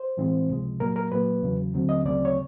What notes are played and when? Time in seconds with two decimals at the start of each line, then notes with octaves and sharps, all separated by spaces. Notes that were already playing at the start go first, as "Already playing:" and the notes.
Already playing: C5
0.17 A2 E3 G#3 C4
0.49 C#2 C3 F3 G#3
0.80 A#2 F#3 A#3 A#4
0.96 A#4
1.11 A#2 F#3 A#3 B4
1.42 E2 C#3 F#3
1.74 D#2 D3 F#3 A3 C4
1.89 D#5
2.05 D2 C#3 F#3 A3 C4 D5
2.25 C#5